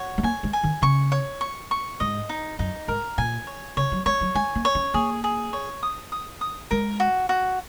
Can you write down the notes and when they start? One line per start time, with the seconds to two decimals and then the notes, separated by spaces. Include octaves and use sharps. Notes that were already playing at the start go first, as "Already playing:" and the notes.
Already playing: F#4 C#5
0.18 G#3
0.23 A#3 G#5
0.43 G#3
0.53 G#5
0.63 D#3
0.82 C#3 C#6
1.12 C#5
1.41 C#6
1.71 C#6
2.00 G#2 D#5
2.29 D#4
2.59 F#2 D#4
2.88 G#2 A#4
3.18 A#2 G#5
3.47 C#5
3.77 C#3 C#5
3.92 F#3
4.06 G#3 C#5
4.21 F#3
4.35 G#3 G#5
4.55 A#3
4.65 C#5
4.75 C#4
4.94 A#3 G#4
5.24 G#4
5.53 C#5
5.83 D#6
6.12 D#6
6.41 D#6
6.71 G#3 A#4
7.00 F#4
7.29 F#4